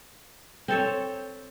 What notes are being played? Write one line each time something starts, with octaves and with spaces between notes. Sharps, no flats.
C4 A4 C#5